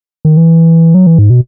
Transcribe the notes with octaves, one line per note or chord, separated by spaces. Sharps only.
D#3
E3
F#3
E3
G#2
B2